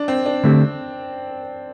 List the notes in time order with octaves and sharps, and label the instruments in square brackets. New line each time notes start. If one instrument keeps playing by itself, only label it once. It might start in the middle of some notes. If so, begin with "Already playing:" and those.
Already playing: [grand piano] D4
C4
D4
[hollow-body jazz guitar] D3 A3 C4 G4